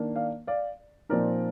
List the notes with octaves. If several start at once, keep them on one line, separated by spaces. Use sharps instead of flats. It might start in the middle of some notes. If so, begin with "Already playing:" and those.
Already playing: D#3 A#3 D4
D5 F5
D5 F5
A#2 F3 C4 D#4 A#4 D5